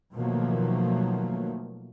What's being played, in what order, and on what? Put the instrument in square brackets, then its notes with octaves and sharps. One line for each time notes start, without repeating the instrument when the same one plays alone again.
[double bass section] B2 D#3 F3 F#3 A3 A#3